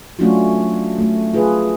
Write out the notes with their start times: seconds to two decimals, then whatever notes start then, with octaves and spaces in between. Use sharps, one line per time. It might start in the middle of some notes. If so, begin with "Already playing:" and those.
0.19 F#3 A3 C#4 D4 F4 F#4
0.98 A3
1.34 F4 G#4 B4